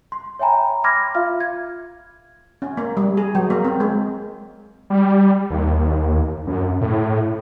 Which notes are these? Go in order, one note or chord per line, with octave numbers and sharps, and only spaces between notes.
C6
C#5 E5 G5 G#5 A#5 B5
B5 C6 D6 F6 G#6 A#6
F4 E5 F5 F6
G#6
C#4
A#3
G3
G#4
F#3
A#3
C4
G#3
G3
D#2
F#2
A2